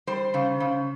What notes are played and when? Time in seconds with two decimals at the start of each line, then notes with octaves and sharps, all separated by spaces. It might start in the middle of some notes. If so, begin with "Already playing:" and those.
0.07 G3 C5
0.34 C#3
0.60 C#3